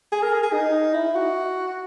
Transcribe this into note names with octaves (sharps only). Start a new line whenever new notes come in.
G#4
A#4
G#4
G#4
D#4
E4
F#4